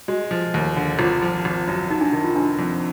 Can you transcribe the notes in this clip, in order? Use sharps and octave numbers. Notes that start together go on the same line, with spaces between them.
G#3 F#4
F3
D#2
D3
G#1 F4
F3
G#1
F#2
F#3 D#4
D4
D#3 D#4
F4
F1 D4
F2